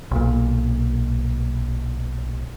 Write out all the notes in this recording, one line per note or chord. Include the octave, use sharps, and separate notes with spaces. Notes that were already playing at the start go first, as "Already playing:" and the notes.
B1 A#2